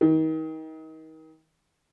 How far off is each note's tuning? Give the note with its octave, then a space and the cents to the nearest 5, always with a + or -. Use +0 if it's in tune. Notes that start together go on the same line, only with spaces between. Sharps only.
D#3 +35